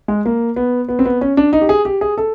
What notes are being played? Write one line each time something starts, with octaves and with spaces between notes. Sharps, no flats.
G#3
A#3
B3
B3
C4
B3
C#4
D4
D#4
G4
G#4
G4
G#4
A4